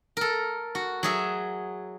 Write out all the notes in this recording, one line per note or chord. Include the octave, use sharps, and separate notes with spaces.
A4 A#4
F#4
F#3 G#4 E5